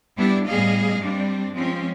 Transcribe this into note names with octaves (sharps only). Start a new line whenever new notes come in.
G3 B3 D4 E4 G4
A2 G3 B3 G#4 D#5 F5
G2 G3 C4 D4
F3 G#3 C4 C#4